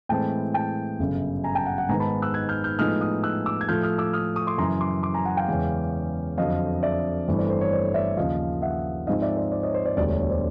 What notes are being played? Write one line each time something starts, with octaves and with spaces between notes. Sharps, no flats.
A2 E3 G#3 C4 G5 A5
G5 A5
G1 F#2 C#3
G#5 A#5
G5 A5
F#5 G#5
F#5 G#5
G#2 D#3 G#3 B3 G#5 A#5
A5 B5
E6 F#6
F#6 G#6
F6 G6
F6 G6
A2 F3 G#3 B3 D#4 D#6 F6
D#6 F6
E6 F#6
D6 E6
G#6
A2 F3 A3 F6 G6
D#6 F6
D6 E6
D#6 F6
C#6 D#6
C6 D6
F#2 C#3 E3 A#5 C6
C6 D6
C6 D6
G#5 A#5
F#5 G#5
F5 G5
E2 C#3 E3 G#3 C#4
F2 D3 F#3 D#5 F5
D5 E5
G1 G2 E3 A3 C4
C5 D5
C5
C#5
C5 D5
D5 E5
D#2 C#3 F3 D#5 F5
E5 F#5
G#2 F3 G#3 C4 D#4 D#5 F5
D5 E5
C5 D5
C5 D5
C#5 D#5
C5 D5
C5 D5
E1 D2 D3 G3 C5 D5
C#5
C#5
C5 D5